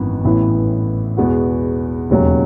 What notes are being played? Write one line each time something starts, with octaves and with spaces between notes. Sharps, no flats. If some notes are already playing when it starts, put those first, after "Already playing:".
Already playing: G#1 F#2 E3 B3
A1 A2 E3 B3 E4
E2 B2 G#3 B3 F#4
E1 D#2 C#3 F#3 C#4